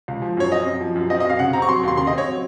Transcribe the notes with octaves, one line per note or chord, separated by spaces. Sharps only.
C#2
F3
F#2 C#5
C4 D#5
F#2
F3
F#2
C4 D#5
D#5
F#2 F5
C#3 F#5
C4 A#5
C#6
F#3 C6
D#2 C6
C#3 C6
D#5
C4 C#5
F#3